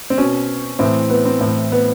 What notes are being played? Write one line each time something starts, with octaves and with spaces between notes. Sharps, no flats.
C4
B2 C#4
A2 E3 C4
B3
C4
A2 E3
B3